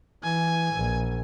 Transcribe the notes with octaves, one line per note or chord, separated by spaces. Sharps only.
E3 G#5
A#1